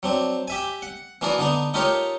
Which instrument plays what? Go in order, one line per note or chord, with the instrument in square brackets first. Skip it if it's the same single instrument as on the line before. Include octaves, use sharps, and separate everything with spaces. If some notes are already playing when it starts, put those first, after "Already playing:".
[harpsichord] F#3 C4 D4
G4 E5 G#5
F#5
E3 A#3 D4 F#4 G#4 D5
D3 B3 D4 D#4
D#4 F4 G4 A4 A#4 C#5